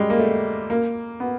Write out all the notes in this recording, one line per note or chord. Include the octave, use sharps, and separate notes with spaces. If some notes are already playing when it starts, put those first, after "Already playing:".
Already playing: G3 G#3
A#3
A3
A#3
B3